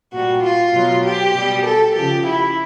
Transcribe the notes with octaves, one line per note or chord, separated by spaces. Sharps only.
A#2 G3 F#4
F4
B2 F#3
G4
B2 G3
A4
C#3 F3 G4
E4